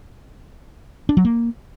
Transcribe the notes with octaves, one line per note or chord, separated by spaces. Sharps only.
D4
F#3
A#3